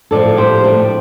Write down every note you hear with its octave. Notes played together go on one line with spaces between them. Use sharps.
A2 F3 A4 D5
G4 C5
A3 D4